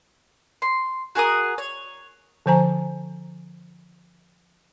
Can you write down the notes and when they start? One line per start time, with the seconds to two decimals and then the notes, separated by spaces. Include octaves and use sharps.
0.62 C6
1.15 F#4 G#4 A#4 D#6
1.58 C#5
2.46 D3 F3 C5 G#5 A#5